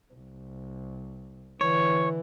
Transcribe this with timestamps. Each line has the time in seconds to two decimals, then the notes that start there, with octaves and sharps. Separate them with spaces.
0.14 C2
1.61 D3 E3 C#5